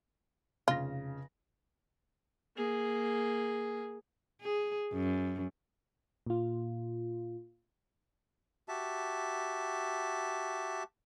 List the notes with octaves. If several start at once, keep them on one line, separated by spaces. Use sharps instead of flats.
F1 C#3 F4 A#6
A#3 G#4
G#4
F#2
A#2 F4
F#4 G4 E5 A5